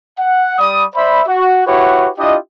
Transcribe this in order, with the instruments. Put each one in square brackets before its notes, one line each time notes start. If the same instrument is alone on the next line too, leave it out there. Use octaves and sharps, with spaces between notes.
[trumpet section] F#5
G3 D5 B5 D#6
C5 D5 E5 B5
F#4
E4 F#4 G4 B4 C#5 F#5
D4 E4 F4 G4 D#5